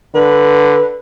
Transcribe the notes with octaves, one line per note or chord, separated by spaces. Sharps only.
D3 B4